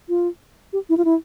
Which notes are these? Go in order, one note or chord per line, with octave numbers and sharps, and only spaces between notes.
F4
G4
E4
F4
E4